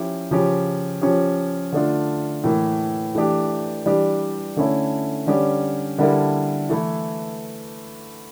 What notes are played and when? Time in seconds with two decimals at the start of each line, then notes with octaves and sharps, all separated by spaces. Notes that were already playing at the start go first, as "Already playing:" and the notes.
Already playing: F3 C#4 E4 G4
0.31 C#3 F3 C#4 G4
1.01 F3 C#4 G4
1.72 D3 A3 D4 F4
2.44 A2 E3 A#3
3.15 E3 A3 D4 G4
3.86 E3 G3 D4 G4
4.56 D3 A3 C#4 E4 A4
5.27 D3 G3 C#4 G4
5.98 D3 G3 A#3 E4 A4
6.69 E3 A3 E4